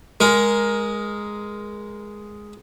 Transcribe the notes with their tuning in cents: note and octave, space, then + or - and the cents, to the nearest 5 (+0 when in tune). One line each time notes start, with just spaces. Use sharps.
G#3 +0 A#4 +15